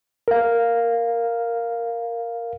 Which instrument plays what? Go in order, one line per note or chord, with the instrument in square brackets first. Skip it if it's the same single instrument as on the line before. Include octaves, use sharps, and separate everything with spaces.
[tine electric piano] A#4 F5